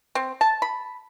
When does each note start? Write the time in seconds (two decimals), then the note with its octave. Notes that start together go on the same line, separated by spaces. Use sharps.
0.15 C4
0.41 A5
0.62 B5